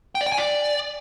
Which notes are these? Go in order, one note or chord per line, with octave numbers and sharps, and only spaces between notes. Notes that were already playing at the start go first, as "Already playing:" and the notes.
G5
D5
G5
G#5
D5